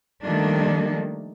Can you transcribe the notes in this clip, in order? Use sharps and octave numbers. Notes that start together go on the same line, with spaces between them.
D#3 F3 G3 A3 A#3 D4